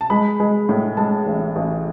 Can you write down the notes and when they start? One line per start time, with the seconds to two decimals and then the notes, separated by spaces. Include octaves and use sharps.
0.01 A5
0.10 G#3 B5
0.40 G#3
0.69 A2
0.97 G#3 A5
1.26 A1
1.56 A1